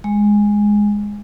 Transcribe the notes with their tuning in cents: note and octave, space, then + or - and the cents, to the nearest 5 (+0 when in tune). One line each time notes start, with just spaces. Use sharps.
G#3 -5